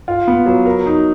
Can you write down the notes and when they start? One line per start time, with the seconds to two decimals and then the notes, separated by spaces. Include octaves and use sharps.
0.08 F4
0.27 B3
0.46 F#3
0.66 A#4
0.86 D#4